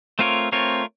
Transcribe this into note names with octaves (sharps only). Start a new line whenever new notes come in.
A3 C4 F4 A#4 C#5
A3 C4 F4 A#4 C#5